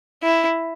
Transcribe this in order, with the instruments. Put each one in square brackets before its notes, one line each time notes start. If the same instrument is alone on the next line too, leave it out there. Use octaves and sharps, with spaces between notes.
[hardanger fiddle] E4